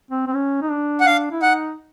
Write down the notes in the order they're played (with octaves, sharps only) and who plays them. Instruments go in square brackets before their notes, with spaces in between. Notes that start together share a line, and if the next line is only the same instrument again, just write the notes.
[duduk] C4
C4
C#4
D#4
D4
[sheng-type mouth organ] F#5
[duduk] D4 [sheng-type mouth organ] F5
[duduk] E4
[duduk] D#4 [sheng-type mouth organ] F#5